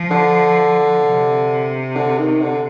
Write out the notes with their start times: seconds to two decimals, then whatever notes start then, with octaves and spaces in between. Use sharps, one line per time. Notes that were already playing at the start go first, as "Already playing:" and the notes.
Already playing: F3
0.11 D3
1.04 C3
1.95 D3
2.18 D#3
2.41 D3